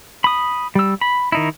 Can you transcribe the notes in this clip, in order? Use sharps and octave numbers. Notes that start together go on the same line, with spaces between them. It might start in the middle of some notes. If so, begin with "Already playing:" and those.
B5 D#6
G3 E6
B5
D#3 D#4 E4